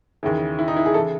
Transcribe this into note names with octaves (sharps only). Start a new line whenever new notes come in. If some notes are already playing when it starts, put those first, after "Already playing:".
D#2 C#3 E3
E4
D#4
E4
G#4
C#3 E3 A4